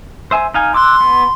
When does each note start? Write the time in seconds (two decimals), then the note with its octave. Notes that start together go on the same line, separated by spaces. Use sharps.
0.31 C5 E5 G#5
0.54 D#4 F5 G#5
0.74 C6 D6 E6 F#6
1.01 B3